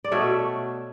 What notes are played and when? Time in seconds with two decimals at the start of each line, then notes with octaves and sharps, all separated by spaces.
0.04 D5
0.11 B2 A3 C#5 E5